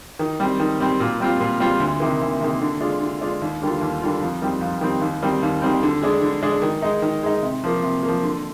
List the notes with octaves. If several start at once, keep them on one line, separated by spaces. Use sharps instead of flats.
D#3
G3 C4
D#3
G3 C4
A#2
G3 C4 F4
A#2
G3 C4 F4
D2
C3 D#3 A#3
D2
C3 D#3 A#3
D3
G#3 D4 F4
D3
G#3 D4 F4
D#2
D3 G3 A#3 F4
D#2
D3 G3 A#3 F4
F2
D#3 G3 C4
F2
D#3 G3 C4
D#2
D#3 G3 C4
D#2
D#3 G3 C4
D3
G#3 D4 G#4
D3
G#3 D4 G#4
D#3
G#3 D#4
D#3
G#3 D#4
C3
F3 A#3
C3
F3 A#3
D3